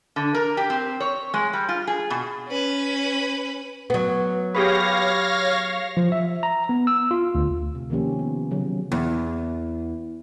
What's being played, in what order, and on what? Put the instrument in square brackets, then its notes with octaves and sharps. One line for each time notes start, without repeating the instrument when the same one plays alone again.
[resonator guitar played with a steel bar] D3
A#4
G4
C4
C#5
G#3
G3
F4
G#4
B2
[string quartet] C#4 B4
[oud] F#3 B3
[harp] G4 G#4 B4 [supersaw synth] C#5 F5 A#6
[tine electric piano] F3
E5
A#5
B3
E6
F4
D2
[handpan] C3
D#3 F3 A#3 C#4 G4
B3
C#3 F#3
[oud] E2